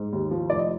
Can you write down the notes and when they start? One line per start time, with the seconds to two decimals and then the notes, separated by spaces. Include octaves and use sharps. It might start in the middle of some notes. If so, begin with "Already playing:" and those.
Already playing: G#2
0.13 D#2
0.31 F3
0.50 F1 D5
0.59 D#5